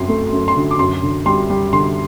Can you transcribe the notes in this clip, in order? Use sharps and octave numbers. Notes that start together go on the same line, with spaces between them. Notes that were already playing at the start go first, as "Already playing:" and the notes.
Already playing: F#2 C4 C6
A3
F#2
C6
D3
D6
F#2 C6
D3
G3 C6
G3
D3 C6